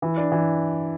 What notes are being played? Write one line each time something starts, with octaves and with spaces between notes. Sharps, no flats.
E3
D4
E3